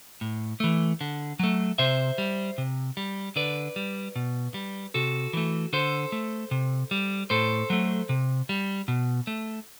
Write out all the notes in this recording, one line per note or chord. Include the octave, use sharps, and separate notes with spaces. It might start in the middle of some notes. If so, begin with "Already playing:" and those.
A2
E3 A3
D3
F#3 A3
C3 C5 E5
G3
C3
G3
D3 B4 D5
G3
B2
G3
C3 F#4 A4
E3 A3
D3 A4 C5
A3
C3
G3
A2 A4 C5
F#3 A3
C3
G3
B2
A3